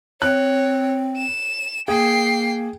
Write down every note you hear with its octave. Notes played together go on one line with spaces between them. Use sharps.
C4 C#5 F#6
E7
A#3 G#4 G5 C7